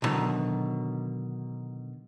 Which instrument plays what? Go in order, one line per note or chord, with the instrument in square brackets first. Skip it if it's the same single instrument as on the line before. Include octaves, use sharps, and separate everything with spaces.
[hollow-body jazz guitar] C2 B2 D3 D#3 F#3 A#5